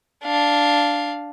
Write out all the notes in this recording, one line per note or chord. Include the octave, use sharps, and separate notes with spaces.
D4 F5